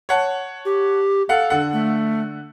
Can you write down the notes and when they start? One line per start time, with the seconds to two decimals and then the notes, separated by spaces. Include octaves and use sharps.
0.09 C#5 F#5 A5
0.65 G4
1.29 A4 F5 F#5
1.50 D3 F#5
1.73 A3